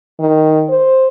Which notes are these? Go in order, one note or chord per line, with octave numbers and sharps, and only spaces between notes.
D#3
C5